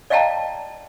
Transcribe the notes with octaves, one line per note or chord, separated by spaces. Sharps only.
D5 D#5 F5 G5 A5 A#5